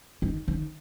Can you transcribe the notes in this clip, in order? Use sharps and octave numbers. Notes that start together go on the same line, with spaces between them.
D#3
D#3